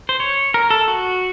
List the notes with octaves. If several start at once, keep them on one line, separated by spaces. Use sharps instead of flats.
C5
C#5
A#4
A4
F#4